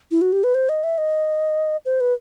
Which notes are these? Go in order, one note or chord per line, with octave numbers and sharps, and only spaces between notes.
E4
F#4
G4
B4
C5
D#5
E5
D#5
C5
B4